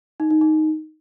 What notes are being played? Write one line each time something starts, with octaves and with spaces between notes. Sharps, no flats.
D#4
D#4
D#4